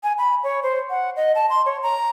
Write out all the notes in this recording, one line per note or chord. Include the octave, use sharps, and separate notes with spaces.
G#5
B5
C#5
C5
F#5
D#5
A5
C6
C#5
A#5